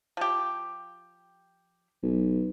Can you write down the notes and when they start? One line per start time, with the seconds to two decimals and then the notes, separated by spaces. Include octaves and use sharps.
0.17 F3 G4
2.03 B1